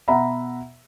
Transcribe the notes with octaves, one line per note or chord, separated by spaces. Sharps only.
B2 E5 F#5 A#5 B5